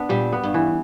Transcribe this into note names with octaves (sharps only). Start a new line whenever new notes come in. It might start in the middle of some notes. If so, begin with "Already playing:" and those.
Already playing: B3 D4
A#2 G3
B3
G2
E3